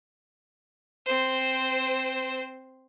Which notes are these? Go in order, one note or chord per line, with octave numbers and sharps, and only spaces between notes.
C4 C5